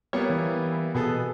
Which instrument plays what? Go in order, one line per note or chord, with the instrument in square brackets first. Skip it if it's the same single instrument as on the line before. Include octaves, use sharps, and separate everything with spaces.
[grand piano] G3 A#3 B3 [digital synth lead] C#5
[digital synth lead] E3
[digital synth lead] B2 [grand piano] B3 G#4 A4